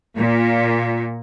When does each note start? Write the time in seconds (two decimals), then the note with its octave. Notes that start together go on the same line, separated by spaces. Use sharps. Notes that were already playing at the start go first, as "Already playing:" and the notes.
0.17 A#2